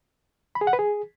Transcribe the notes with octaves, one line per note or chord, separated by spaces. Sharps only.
B5
G#4
F#5
B4
G#4